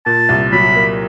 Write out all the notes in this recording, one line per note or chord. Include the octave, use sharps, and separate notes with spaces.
A#2 A5
C2
F#3 B5
A#3